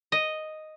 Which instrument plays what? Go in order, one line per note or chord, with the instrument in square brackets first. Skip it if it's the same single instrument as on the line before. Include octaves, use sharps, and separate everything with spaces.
[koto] D#5